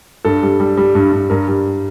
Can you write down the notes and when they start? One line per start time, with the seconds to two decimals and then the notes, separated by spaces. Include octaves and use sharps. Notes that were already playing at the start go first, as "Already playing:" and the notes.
0.25 G2 A4
0.43 G3
0.60 G3
0.77 G3
0.95 G2
1.12 G2
1.30 G2 A#4
1.48 G3